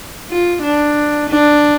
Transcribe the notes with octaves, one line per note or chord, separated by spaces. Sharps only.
F4
D4
D4